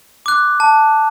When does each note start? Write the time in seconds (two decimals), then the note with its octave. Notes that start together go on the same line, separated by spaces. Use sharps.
0.26 D6 F#6
0.60 A5